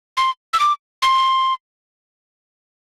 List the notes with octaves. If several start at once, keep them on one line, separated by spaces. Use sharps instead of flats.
C6
E6
D6
C6